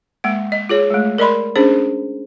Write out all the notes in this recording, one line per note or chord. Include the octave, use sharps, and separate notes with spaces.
G#3 A#3 F#5
D#5
F4 G#4 C#5
G#3 A3
A#4 D5 D#5 B5 C6
C#4 D4 G#4 C5